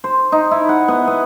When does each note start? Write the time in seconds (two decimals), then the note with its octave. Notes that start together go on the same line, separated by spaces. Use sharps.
0.04 C5
0.32 D#4
0.51 E4
0.69 F#5
0.88 B3
1.07 B3